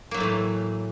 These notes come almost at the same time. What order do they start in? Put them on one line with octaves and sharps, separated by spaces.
A#3 F#3 A3 A2 E3